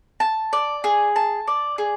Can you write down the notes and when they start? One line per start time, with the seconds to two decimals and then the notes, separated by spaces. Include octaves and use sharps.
0.20 A5
0.53 D5
0.84 G#4
1.16 A5
1.48 D5
1.78 G#4